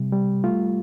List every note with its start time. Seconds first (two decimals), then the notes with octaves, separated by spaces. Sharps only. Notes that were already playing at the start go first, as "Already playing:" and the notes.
Already playing: C3 G3
0.12 G3
0.44 A3 F4